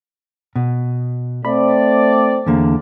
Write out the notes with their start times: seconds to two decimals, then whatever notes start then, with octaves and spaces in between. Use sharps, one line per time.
0.56 B2
1.45 A3 C4 D5 B5
2.46 E2 D3 A#3